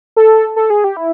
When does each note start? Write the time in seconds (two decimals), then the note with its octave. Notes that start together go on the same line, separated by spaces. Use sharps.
0.16 A4
0.56 A4
0.70 G#4
0.84 G4
0.97 E4